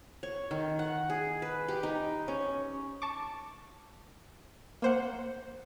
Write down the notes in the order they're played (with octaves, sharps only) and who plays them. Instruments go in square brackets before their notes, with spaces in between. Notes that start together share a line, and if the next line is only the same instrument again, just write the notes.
[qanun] C#5
D#3
F#5
G#4
B4
G4
D#4
C#4
[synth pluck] A5 C#6 D6
A#3 C5 F#5